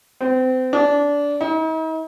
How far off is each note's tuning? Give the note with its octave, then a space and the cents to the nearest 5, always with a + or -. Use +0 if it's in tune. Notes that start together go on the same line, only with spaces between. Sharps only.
C4 -30
D4 -20
D#4 +45